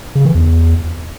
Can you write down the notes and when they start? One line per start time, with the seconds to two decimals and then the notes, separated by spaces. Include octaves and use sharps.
0.15 C#3
0.25 E3
0.35 E2